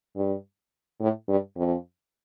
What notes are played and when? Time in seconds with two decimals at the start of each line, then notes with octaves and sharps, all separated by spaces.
0.16 G2
1.01 A2
1.28 G2
1.57 F2